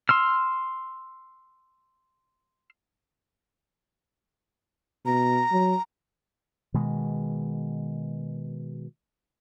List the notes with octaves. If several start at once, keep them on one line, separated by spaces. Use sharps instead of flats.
C6 E6 F6
B2 A#5
F#3
B2 D#3 G#3